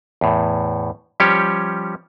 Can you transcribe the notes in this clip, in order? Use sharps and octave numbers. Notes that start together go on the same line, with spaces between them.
E2 A2
F3 G3 C#4 G4 C#5